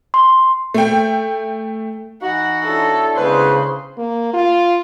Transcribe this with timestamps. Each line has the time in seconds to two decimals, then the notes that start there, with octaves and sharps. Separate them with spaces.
0.14 C6
0.74 A3 G5
2.22 E3 D#4 F#4 F#5
2.64 D4 E4 A4 C#5
3.17 C#3 G#3 B3 B4 C5
3.97 A#3
4.33 F4